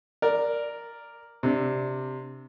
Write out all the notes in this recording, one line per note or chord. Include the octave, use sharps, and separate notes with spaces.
A#4 D5
C3 D4